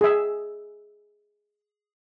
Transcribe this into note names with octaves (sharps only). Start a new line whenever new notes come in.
G#4 E5